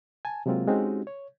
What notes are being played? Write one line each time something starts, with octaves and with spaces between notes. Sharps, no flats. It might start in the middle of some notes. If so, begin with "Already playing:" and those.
G#5 A5
C3 F#3 G#3 A#3 C4 F4
G#3 C4 C#4 D#4 F#4 G4
C#5